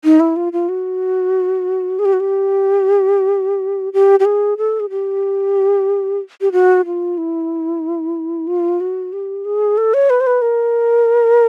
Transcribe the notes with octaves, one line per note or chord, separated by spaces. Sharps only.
D#4
E4
F4
F4
F#4
G#4
G4
F#4
G4
G4
G4
G#4
A4
G#4
G4
G4
F#4
F4
E4
F4
F#4
G4
G#4
A4
C#5
B4
C5
B4
A#4